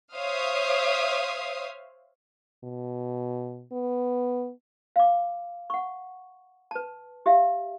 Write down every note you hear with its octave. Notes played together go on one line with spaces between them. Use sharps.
C5 C#5 E5 F5 D#6
B2
B3
F5 D6
F#5 C#6
B4 A5
G4 E5 F5